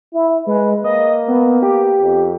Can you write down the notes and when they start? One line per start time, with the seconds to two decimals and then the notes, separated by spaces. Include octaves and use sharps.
0.13 E4
0.47 G#3 B4
0.84 A#3 D#5
1.28 B3
1.62 G4
2.02 F2